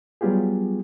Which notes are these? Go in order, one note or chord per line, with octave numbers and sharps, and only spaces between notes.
F#3 G3 B3 F4 G4 G#4